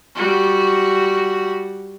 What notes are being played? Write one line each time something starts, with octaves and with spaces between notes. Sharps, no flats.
G3 F#4